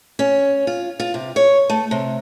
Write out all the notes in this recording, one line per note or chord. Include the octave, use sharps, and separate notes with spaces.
C#4
F4
F4
C3
C#5
A3
C3